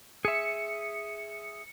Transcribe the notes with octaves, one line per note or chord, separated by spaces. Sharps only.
G#4 E5 C#7